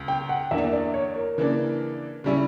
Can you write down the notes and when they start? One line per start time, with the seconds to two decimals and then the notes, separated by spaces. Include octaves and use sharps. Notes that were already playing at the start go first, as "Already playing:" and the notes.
Already playing: C#2 C#3
0.08 G5
0.29 F#5
0.51 E2 D3 A#3 D4 E5
0.73 D5
0.94 C#5
1.16 A#4
1.38 C#3 E3 A#3 D4
2.24 C#3 G3 C#4 E4